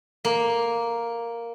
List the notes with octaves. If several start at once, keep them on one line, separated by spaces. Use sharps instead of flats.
A#3